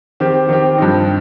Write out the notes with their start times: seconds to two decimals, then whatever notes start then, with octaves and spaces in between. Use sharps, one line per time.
0.20 D#3 C4 G4
0.49 D#3 C4 G4
0.78 G2 F3 C4 D#4